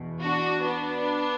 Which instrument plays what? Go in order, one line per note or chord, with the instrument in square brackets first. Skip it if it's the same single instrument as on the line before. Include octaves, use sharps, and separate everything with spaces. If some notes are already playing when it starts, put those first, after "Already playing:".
Already playing: [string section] E2 B2
D4 F#4
B3 D4